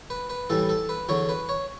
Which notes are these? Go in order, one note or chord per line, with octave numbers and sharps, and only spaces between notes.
B4
B4
A2 E3 G3 A4
A4
B4
E2 D3 F#3 C#5
B4
C#5